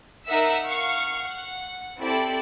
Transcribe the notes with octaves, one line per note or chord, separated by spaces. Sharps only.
D#4 A#4 E5 F#5 E6 B6
F5 F#5 C#6 F6
F#5
C4 E4 G4 A4 D5